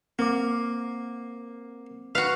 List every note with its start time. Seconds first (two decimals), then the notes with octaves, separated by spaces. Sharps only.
0.19 A#3 C4 D6
2.15 F#4 B4 F5